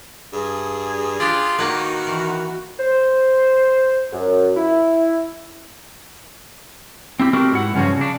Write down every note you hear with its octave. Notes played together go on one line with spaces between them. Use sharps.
G2 G#4
D4 F4 G4 D5
D#3 A#3 F#4 B4
E3
C5
F#2
E4
C4 E4 G4
A3 C4 D4 F#4 G4 A#4
G#2 E4 F#5
G2 C#3 F3 C#4 F#4
C#3 D4